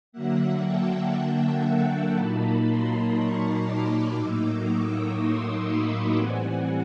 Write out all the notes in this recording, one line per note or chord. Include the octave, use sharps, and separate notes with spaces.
D3 F#3 A#3 E5 F#5
G5 A5
G5 A5
A#2 F#3 A#3 D#4 A5 B5
A#5 C6
B5 C#6
C6 D6
A2 F#3 A#3 D#4 D6 E6
C#6 D#6
C6 D6
B5 C#6
A2 E3 G3 C4 F#5 G#5